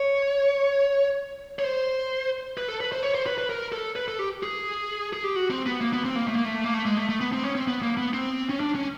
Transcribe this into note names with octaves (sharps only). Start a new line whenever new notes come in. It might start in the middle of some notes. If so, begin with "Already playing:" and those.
Already playing: C#5
C#5
C5
B4
A4
B4
C5
C#5
C5
B4
B4
A#4
A4
B4
A4
G4
G#4
G#4
G4
F#4
C4
B3
A#3
B3
C4
A#3
A3
A#3
A3
A#3
A3
G#3
A3
A3
B3
C4
C#4
C4
B3
A#3
B3
C4
C#4
D4
C#4